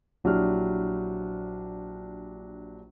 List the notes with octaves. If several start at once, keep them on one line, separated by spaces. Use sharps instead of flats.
A#1 F#3 D4 E4 G4 F6